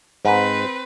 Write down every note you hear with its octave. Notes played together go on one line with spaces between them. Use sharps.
G#2 C4 B4